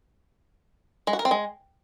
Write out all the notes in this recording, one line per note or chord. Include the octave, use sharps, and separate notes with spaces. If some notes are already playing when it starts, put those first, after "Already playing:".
G#3
F#4
A#4
C4
G#3